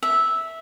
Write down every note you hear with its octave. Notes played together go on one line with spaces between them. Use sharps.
E5